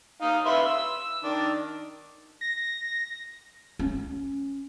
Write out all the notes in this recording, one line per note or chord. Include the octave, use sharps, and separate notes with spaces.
D#4 F5
B4 E5 C6
E6
D#3 D4
A#6
C#4